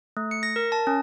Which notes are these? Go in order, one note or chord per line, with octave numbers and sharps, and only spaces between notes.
A3
C#7
A#6
A#4
A5
C#4